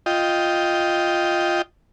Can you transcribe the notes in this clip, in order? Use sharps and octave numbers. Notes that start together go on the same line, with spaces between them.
F4 D#5 G5